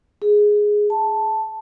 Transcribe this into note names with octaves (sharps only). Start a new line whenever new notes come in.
G#4
A5